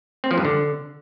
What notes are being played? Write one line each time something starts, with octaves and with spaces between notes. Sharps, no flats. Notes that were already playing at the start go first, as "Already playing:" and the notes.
C4
F3
G2
D3